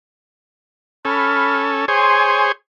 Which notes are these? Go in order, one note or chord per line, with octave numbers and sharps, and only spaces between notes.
C#4 A4 B5 F6
G#4 C5 C#5 G#5 C6